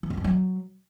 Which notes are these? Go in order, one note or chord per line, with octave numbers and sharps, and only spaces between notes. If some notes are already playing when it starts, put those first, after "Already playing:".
E3
F#2
D#3
F#3